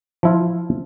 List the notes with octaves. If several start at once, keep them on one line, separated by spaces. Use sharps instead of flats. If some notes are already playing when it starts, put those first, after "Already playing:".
F3 E4 F4